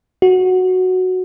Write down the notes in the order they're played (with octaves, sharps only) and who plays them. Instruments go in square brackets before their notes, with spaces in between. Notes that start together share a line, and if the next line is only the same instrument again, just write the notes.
[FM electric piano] F#4